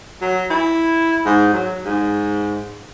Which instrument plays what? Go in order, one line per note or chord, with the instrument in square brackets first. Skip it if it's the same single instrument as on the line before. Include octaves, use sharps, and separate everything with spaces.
[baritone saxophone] F#3
E4
G#2
F#3
G#2